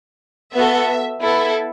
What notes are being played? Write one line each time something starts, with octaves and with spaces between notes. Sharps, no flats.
B3 F#4 A4 E5
B3 E4 A4